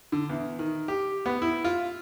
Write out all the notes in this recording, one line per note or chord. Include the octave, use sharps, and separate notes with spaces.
D3
E2
D#3
G4
B3
E4
F4